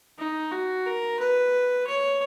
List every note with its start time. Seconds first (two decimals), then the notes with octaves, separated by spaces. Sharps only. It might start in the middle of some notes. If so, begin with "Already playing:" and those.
0.19 D#4
0.51 F#4
0.86 A#4
1.19 B4
1.87 C#5